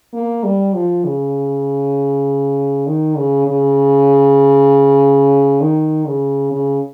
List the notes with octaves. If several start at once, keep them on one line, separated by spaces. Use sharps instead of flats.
A#3
G3
F3
C#3
D#3
C#3
C#3
D#3
C#3
C#3